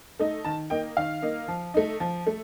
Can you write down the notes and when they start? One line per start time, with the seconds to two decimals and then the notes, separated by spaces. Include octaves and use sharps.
0.19 A3 D#4
0.45 D#3 A5
0.70 A#3 D#4 G5
0.97 D#3 F5
1.22 A#3 D#4
1.48 F3
1.74 A3 D#4
2.00 F3
2.27 A3